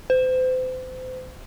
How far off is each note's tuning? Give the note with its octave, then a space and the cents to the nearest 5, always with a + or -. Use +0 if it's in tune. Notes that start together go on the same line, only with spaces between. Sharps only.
C5 -35